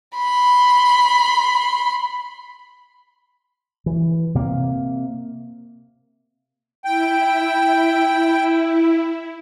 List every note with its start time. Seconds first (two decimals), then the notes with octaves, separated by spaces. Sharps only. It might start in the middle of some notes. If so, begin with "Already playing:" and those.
0.17 B5 C6
3.86 E3
4.35 C3 A#3
6.85 E4 G5